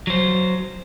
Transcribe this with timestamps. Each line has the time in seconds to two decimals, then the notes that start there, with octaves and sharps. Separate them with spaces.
0.07 F#3 C5